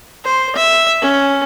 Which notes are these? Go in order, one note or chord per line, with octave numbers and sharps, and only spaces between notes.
C5
E5
C#4